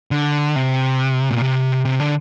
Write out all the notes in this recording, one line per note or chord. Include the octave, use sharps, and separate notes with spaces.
D3
C3
A#2
C3
C3
D3